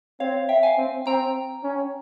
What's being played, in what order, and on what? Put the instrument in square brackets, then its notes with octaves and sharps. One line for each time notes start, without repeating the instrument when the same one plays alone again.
[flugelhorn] C4 [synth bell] C#5 F5
[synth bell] E5 G5
F5 G#5
[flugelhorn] C4
[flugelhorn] C4 [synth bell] G5 A#5
[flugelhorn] C#4